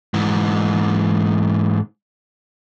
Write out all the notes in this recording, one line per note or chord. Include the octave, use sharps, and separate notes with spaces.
G#2 E3